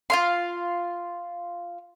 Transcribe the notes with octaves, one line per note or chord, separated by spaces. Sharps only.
F4 F5 C6